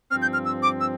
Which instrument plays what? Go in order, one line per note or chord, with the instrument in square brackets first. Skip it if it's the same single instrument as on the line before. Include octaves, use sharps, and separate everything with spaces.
[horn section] G2 F3 C4 [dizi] F6
[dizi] G6
F6
E6
D6
E6